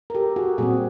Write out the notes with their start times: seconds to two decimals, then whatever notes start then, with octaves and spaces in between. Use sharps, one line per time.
0.10 A#4
0.15 G4 A4
0.36 F#4 G#4
0.58 A#2 G3 C4 F#4 G#4